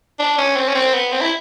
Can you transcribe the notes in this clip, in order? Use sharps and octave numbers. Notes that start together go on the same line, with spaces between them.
D4
C#4
C4
C#4
C4
B3
C4
E4